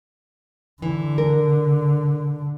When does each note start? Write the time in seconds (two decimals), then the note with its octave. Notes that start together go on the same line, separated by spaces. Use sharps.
0.82 D3 E3
1.18 A#4